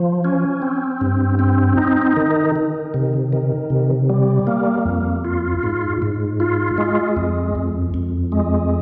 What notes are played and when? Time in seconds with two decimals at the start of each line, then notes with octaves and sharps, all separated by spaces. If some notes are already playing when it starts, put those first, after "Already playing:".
Already playing: F3
0.24 C#4
0.62 C4
1.01 G2
1.39 C4
1.77 D#4
2.17 D#3
2.56 D#3
2.94 C3
3.33 D#3
3.70 C3
4.10 G3
4.47 A#3
4.85 F2
5.25 F4
5.63 G#2
6.02 G#2
6.40 F4
6.78 G#3
7.16 F2
7.55 F2
7.94 F2
8.32 G#3